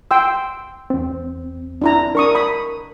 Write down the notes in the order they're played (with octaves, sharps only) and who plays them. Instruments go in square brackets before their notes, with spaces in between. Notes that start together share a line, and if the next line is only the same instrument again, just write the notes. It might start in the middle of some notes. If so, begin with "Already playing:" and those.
[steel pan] G5 C6 E6
[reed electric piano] E2 C4
[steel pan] D4 E4 A#5
[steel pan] D4 C#6 D#6 [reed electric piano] A#4
[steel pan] B5 D#6